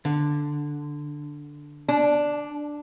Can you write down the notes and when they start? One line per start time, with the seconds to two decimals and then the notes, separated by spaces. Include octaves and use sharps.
0.05 D3
1.88 D4